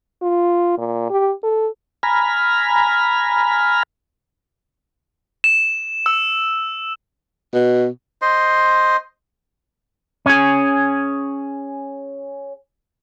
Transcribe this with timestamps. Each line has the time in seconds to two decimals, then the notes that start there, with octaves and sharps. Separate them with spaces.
0.22 F4
0.78 A#2
1.10 G4
1.44 A4
2.03 G#5 A#5 B5 F6
5.44 E7
6.06 E6
7.54 B2
8.22 C5 D#5 C6
10.26 C#4 G#4